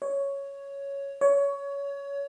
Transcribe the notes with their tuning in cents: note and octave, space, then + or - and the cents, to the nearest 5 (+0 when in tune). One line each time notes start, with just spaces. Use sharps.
C#5 +5
C#5 +20